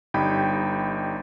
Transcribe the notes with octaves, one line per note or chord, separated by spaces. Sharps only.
G1 G3 D#4 G5 B5